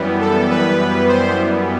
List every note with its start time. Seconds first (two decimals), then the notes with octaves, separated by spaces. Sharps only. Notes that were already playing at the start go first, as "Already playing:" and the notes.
Already playing: F#2 E3 G3 B3
0.21 A4
0.50 B4
1.08 C5